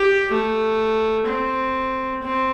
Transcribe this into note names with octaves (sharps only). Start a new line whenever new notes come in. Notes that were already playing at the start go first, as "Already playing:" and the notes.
Already playing: G4
A3
C4
C4